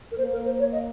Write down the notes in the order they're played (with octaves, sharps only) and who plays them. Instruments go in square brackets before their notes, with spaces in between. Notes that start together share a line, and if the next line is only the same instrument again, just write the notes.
[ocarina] A#4
[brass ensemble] A#3 [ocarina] C5
[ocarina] A#4
C5
C#5
D#5